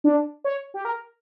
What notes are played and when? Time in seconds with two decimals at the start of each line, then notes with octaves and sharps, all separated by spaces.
0.04 D4
0.44 C#5
0.74 G4
0.85 A#4